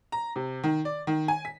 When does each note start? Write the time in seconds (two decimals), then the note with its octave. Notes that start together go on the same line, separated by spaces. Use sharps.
0.12 A#5
0.36 C3
0.64 D#3
0.85 D5
1.07 D#3
1.28 G#5
1.45 B6